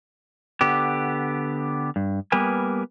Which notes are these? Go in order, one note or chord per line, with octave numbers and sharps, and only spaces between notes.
D3 B3 G4
G2
G3 A#3 B3 A#4 B4 G#5